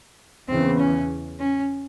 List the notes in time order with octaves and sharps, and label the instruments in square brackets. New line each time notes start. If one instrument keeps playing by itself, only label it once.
[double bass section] E2 C#3 E3 [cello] C4
[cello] C#4
C#4